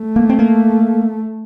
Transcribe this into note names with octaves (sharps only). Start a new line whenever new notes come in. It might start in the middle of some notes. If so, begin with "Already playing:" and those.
Already playing: A3
A#3
C4
A#3